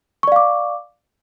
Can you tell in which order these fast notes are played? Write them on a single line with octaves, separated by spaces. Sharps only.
C#6 D5 F5 D6